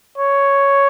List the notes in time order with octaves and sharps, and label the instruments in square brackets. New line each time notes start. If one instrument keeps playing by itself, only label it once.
[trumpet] C#5